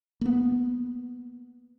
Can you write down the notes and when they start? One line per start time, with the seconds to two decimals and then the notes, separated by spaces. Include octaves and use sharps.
0.21 A#3 B3